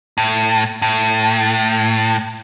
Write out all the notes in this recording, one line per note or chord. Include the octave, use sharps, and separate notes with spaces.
A2
A2